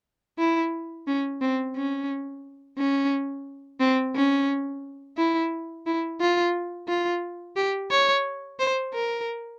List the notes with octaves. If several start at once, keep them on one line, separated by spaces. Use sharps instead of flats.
E4
C#4
C4
C#4
C#4
C4
C#4
E4
E4
F4
F4
G4
C#5
C5
A#4